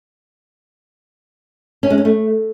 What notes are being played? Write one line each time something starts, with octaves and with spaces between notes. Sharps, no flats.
C#4
G#3
C#4
A3